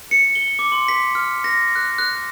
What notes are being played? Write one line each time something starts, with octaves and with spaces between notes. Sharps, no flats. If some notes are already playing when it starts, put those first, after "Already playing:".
C#7
G7
D6
C6
B6
F6
A#6
F#6
F#6